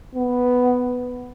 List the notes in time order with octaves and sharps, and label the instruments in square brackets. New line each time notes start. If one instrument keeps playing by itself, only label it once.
[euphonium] B3